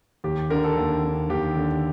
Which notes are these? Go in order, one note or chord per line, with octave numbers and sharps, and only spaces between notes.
D#2 G4
D3 A#4
A4
D#2
D3
D#2 G4
D3